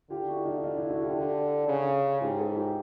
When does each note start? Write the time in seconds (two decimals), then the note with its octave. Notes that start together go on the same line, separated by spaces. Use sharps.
0.10 D3 F4 G4
0.28 E4 F#4
0.45 D#4 F4
0.63 D#4 F4
0.76 D4 E4
0.89 E4 F#4
1.02 F4 G4
1.16 D3
1.68 C#3
2.21 G#2 F4 G4
2.38 G4 A4
2.56 F4 G4